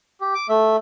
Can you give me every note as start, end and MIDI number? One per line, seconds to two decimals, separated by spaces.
0.21 0.34 67
0.35 0.47 86
0.49 0.76 57
0.49 0.76 76